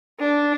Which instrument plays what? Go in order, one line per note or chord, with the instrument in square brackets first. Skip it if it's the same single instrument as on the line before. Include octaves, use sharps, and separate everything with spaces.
[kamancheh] D4